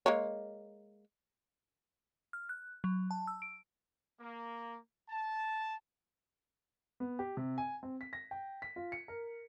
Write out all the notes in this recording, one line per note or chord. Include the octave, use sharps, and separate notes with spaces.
G#3 A#3 C#5
F6
F#6
F#3
A5
E6
D7
A#3
A5
B3
G4
C3
G#5
C4
B6
A#6
G5
B6
F4
C#7
A#4